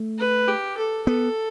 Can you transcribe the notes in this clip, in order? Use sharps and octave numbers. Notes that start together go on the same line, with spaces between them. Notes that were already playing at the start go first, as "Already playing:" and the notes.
Already playing: A3
B4
G4
A4
B3 A4